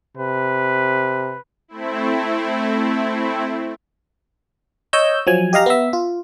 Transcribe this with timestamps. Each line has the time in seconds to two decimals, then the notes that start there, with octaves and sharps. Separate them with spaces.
0.17 C3 B4
1.68 A3 C4 E4
4.93 C#5 D#5 E6 G6
5.27 F3 F#3 G#5
5.53 G4 D#5 F5 A#5
5.66 B3 E5
5.93 F4